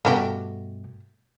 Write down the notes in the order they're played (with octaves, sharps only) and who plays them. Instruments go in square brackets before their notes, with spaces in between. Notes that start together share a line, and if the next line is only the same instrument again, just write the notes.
[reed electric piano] G2 B2 [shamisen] A3 F#4 G4